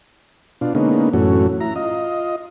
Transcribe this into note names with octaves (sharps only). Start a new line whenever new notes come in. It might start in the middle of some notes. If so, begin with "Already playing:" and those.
B2 D4 F4
D3 G#3 A#3 B3 C#4 D#4
F#2 A2 E3 A3 C#4 F#4
E4 A#5
F4 D#5